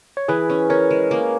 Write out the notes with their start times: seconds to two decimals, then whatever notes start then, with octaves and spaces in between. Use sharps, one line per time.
0.17 C#5
0.28 E3 G#4 B4
0.50 C#4
0.70 C#4 A#4 C#5
0.91 G#3
1.11 A#3